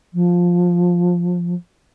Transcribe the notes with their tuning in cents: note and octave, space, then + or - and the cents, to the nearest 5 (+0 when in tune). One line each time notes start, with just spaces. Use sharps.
F3 +10